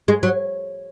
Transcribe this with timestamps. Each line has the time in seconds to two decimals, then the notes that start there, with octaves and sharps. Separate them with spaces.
0.08 G#3
0.23 F#3